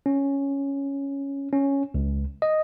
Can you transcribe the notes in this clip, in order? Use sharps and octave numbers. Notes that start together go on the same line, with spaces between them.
C#4
C#4
C#2
D#5